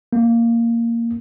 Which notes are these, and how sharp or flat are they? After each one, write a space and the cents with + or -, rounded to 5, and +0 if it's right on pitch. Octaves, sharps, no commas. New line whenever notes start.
A#3 -5